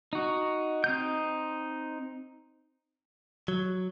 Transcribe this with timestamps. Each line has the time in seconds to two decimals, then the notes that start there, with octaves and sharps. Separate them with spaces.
0.13 D#4 F#4
0.84 C4 D#4 G6
3.48 F#3